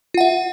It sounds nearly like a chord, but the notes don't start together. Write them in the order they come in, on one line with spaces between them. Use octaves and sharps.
F4 F#5 E5